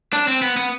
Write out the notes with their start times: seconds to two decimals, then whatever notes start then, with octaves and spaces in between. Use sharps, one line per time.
0.13 D4
0.28 C4
0.42 B3
0.57 B3